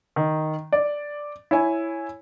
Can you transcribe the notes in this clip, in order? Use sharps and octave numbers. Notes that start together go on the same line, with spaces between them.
D#3
D5
E4 C#5 G#5